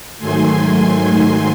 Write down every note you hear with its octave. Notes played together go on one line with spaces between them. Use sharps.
G#2 D#3 F#3 A3 G#5 C6